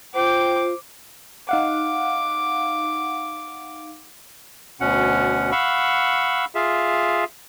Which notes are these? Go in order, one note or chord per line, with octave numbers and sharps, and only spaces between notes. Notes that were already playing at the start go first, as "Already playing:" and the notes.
F4 C5 G5 D6
D#4 F5 F#5 D6
D2 B2 C#4 F#5
F5 F#5 B5 C#6 E6
F4 G#4 E5 F5